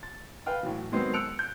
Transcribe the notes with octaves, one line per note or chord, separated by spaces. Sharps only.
A6
B4 F5 G5 F6
A2 E3 F#3
D#3 F#3 G#3 B3 C4
E6 F#6 C#7 D7 F7
G6